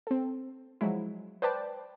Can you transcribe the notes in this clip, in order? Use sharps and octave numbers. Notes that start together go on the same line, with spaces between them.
C4 A4
F3 F#3 G#3 E4
B4 C5 D5 G5 A5